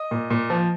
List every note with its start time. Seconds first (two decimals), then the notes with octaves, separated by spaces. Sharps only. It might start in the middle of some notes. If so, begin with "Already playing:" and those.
Already playing: D#5
0.11 A#2
0.30 A#2
0.50 F3